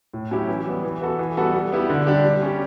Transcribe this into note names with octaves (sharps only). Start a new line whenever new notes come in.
A2
F#3 C#4 E4 G4
E3
G3 B3
E3
B3 F#4 A4
E3
G3 B3 F#4 A4
G3
B3 E4 G4
D3
G3 D4 G4
G3
C#4 G4